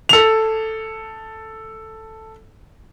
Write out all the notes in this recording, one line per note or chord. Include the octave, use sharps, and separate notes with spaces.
A4 F7